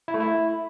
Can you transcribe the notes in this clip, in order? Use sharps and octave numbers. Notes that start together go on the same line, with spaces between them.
E4
A3
E4